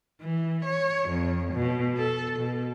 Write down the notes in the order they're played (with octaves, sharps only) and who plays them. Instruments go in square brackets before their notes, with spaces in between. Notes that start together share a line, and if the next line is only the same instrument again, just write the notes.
[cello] E3
C#5
F2
B2
A4
B2